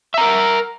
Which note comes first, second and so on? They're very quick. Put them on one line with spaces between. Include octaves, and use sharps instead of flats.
E5 A#5 A#4